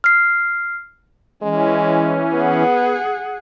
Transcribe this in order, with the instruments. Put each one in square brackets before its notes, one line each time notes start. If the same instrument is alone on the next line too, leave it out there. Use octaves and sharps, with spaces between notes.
[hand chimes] F6 C7
[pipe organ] E3 C#4 [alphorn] G#3
[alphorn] B3 [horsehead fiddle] G#4 F#5